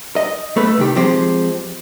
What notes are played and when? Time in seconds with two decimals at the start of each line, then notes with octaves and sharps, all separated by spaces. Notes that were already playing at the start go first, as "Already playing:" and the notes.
0.16 D#5
0.57 A3 B4
0.77 C2 D#3 G4
0.96 F3 G#3 C4 G4 C5